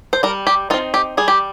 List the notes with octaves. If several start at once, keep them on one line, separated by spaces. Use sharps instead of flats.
C5
G3 A#4
G4
C4 D#4 F4
G4
G3 G#4
G4